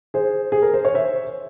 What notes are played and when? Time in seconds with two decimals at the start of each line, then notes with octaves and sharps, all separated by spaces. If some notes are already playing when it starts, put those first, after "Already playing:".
0.14 G#4 C5
0.52 G#4
0.62 A#4
0.74 C5
0.85 C#5
0.94 C5 E5